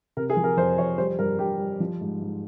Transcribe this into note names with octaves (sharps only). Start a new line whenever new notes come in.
C3 A#4
G#4
F3
A#4
F2 C5
F2 C#5
G3 C5
G2 A#4
G2 G4
G3
F3
G#2
G#2